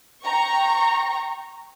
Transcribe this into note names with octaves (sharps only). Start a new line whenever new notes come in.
G5 A#5 C#6